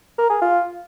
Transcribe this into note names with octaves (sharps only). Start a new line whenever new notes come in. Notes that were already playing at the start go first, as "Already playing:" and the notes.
A#4
G#4
F4